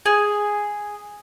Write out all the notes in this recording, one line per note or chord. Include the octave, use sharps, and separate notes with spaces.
G#4